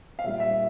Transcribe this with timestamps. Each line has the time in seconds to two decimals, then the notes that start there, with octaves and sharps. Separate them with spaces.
0.19 F5
0.24 A#2 E5
0.27 G3
0.40 E5